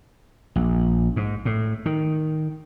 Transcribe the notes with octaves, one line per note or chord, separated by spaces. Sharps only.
A#1
G#2
A2
D#3